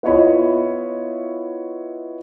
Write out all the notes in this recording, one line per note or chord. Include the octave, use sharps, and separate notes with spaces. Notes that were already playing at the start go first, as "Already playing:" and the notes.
B3 E4 F4 C#5 D#5 B5